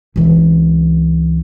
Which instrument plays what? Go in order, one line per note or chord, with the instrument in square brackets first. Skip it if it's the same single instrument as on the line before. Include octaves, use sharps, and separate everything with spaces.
[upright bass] C#2 E3